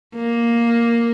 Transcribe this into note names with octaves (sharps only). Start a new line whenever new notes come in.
A#3